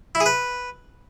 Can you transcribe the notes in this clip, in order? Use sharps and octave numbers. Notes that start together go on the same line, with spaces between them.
E4
G#4
B4